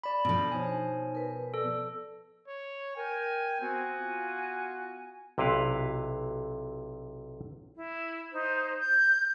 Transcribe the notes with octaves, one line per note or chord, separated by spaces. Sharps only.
D5 B5
B2 F3 B3 D4 A4
D#4 C5 C#5 G#5
A#4 B4
A4 D5 E6
C#5
A#4 G5 G#5
B3 C4 F#4 G#5
F4
B1 C3 E4 B4 F5
E4
D#4 C5
G6